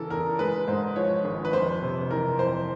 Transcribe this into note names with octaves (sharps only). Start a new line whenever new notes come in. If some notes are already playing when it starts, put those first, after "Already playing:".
Already playing: C#3 E3 A4 A#4
E2 A#4
G#3 B4
G#2 C5
F3 C#5
G#1
B4
F2 C5
C3
E3 A#4
F2 C5